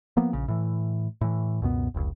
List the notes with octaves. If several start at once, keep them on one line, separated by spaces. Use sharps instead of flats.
F3 A#3 B3
A#1 C#3
A2 E3
A2 E3
C#2 F#2 B2 B3
F1 C#2